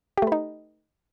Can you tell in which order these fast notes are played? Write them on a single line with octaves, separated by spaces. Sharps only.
G4 A3 B4 D#4